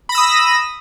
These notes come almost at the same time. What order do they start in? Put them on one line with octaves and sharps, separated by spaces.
B5 A#6 E6 D#6